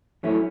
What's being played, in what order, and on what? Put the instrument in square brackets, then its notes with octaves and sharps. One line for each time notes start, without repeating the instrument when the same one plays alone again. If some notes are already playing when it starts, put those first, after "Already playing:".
[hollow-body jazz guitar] F#3 A3 C#4 E4